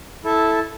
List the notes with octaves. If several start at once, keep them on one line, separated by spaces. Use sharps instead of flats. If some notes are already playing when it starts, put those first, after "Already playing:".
E4 A4 E5 A5